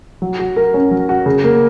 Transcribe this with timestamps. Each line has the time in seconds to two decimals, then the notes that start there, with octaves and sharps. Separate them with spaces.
0.22 F#3
0.39 F#4
0.56 A#4
0.74 C#4
0.91 F#3
1.09 F#4
1.26 C#3
1.44 A#3